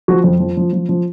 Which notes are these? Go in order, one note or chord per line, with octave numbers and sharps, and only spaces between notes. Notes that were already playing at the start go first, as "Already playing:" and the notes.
F3 F#4
F2
F3
F3
F3
F3